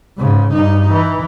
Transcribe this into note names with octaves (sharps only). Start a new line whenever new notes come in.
G#2 C#3
G2 D#4
E3